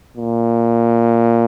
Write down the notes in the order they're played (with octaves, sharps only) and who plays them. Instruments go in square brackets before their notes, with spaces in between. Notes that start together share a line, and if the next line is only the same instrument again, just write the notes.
[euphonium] A#2